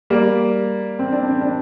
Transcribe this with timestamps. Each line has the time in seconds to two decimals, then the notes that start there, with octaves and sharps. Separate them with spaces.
0.10 G3 A#3
0.99 C4
1.12 D4
1.26 C4
1.41 D4